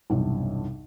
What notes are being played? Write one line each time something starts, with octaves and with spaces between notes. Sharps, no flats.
B1 E2 G2 C3 E3